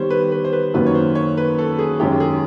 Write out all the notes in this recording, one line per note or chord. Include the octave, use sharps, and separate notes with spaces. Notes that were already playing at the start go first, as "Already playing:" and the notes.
Already playing: D#3 G3 B3 C5 C#5
B4
B4
C5
B4
F#2 D#3 F#3 A#3 B4
C#5
C5
C#5
B4
A4
G#4
F#2 D#3 G#3 C#4 G4
G#4